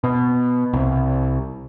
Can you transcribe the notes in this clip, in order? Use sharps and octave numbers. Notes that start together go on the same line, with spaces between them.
B2
C2